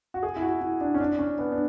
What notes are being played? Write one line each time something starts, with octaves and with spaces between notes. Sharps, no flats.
F#4
G#4
E4
F#4
E4
D4
C#4
D4
C#4
B3
D4